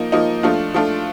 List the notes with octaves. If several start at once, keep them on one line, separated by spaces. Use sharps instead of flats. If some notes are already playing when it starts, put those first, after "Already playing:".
Already playing: F3 A#3 D#4
F3 A#3 D#4
F3 A3 D4 F4
F3 A3 D4 F4